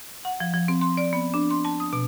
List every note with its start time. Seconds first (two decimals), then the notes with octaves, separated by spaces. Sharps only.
0.25 F#5
0.40 F3
0.54 F3
0.68 C4
0.81 C6
0.97 D5
1.13 B3
1.34 D4
1.50 C6
1.65 A5
1.80 D#6
1.93 B2